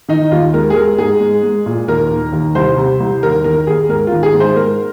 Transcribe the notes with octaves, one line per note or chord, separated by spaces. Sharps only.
D#3 D#4
D#2 F4
G#3 A#4
G#4
G#3 A#4
G#2 G#4
G#3
G#3
A#2
D#2 A#4
D#3
D#2
C2 C5
C3
C2
D#2 A#4
D#3 A#4
D#2 G#4
G#2 A#4
F4
D#3
G#4
G#2
C5
G#3 A#4